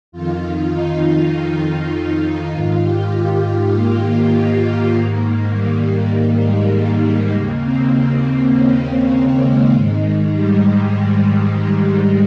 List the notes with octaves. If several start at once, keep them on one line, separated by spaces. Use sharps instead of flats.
F2 D#3 F4
D#4
F4
F4
D#4
F4
F4
G#2 D#3 F4
G4
G4
F4
A#3
G#2 D#3
G3
G3
G#3
A#3
G#3
D#2 C#3 A#3
C4
C#4
C4
G#3
G#2 D#3 G#3
G#3
G3
G#3